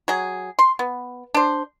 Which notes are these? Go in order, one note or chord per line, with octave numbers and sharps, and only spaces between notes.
F#3 G#4
C6
B3
D4 C5